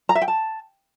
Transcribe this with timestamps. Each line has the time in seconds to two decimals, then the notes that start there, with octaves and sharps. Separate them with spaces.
0.09 A#5
0.15 E5
0.22 G5
0.28 A5